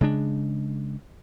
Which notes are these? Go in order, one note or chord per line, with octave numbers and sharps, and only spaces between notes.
C#3 G#3 D4